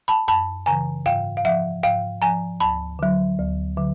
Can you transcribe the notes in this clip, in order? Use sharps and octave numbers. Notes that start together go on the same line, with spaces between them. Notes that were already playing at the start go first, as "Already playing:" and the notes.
A5 B5
F#2 A5 B5
C#3 E3 G#5 A#5
G#2 F5 G5
F5
F3 E5 F#5
G#2 F5 G5
F3 G#5 A#5
D2 A5 B5
D3 F#3
D2
D3 F#3